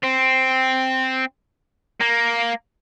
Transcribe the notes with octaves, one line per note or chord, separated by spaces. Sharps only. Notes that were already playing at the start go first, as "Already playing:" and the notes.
C4
A#3